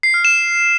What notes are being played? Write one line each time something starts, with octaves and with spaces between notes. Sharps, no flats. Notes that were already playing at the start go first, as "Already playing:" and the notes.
C7
F6
E7